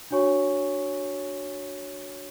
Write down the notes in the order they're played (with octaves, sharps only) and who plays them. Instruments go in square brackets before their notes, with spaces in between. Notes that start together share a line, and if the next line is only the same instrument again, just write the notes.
[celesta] D4 F#4 C#5 G#5 C#6